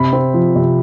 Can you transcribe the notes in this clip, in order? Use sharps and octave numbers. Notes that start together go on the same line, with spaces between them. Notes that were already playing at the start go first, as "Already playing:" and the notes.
Already playing: C3 B5
C4
F3
C3